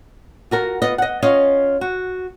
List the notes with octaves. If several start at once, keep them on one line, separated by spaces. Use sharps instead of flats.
F4 F#4 A#4
B3 F4 D#5
D#5 F#5
C#4 F4 C#5 D#5 F5
F#4